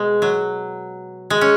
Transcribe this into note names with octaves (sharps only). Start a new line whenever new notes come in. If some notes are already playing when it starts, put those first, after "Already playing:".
Already playing: B2 G#3
F#3
G#3
C#4